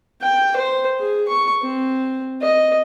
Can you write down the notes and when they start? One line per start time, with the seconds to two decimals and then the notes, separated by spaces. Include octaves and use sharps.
0.22 G5
0.56 C5
1.00 G#4
1.29 C#6
1.62 C4
2.42 D#5